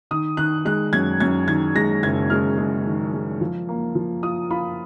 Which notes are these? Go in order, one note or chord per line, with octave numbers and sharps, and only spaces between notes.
D#3 D#6
D#3 F#6
G#3 F#6
F#2 G#6
F#2 G#6
D#3 G#6
G#3 A#6
F#1 G#6
G#3 F6
G#3
D#3
G#3
F3
A#3
F3
F4 D#6
F4 B5